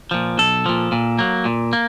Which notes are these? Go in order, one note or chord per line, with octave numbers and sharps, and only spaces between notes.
A#2 F3
B1 A4
A#2 F3
A#2
F#3 A#3
A#2
A#3